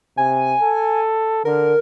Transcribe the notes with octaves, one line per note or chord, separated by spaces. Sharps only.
C3 G#5
A4
D3 A#4